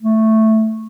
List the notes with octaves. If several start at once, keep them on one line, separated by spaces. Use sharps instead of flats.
A3